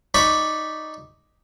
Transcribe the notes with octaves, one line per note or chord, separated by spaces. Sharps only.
D#4 D5 B5 C#6 D6